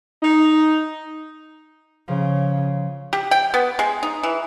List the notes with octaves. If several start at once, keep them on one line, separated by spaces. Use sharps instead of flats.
D#4
C#3 F3
G4
G5
B3
G#3
D#4
E3